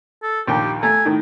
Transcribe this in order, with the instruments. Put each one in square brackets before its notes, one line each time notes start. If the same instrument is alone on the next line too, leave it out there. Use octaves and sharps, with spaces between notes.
[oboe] A4
[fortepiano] A#1 D#2 G5 [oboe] G4
[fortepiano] A3 A#5 [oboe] G#5
[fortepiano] A2 D#3